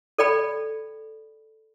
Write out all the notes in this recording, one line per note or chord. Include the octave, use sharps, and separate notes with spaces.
A4 D5 G5 B5